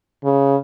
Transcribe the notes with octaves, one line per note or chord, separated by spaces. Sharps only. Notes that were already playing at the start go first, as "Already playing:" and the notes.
C#3